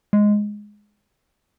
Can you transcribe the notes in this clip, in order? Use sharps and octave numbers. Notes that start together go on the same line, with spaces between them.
G#3